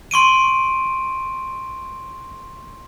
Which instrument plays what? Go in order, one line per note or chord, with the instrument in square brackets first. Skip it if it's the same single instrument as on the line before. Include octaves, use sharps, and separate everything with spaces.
[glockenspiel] C6 C#6 D7 D#7